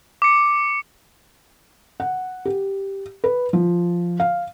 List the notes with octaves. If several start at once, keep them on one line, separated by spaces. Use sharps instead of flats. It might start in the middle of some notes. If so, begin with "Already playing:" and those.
D6 C#7
F#5
G4
B4
F3
F5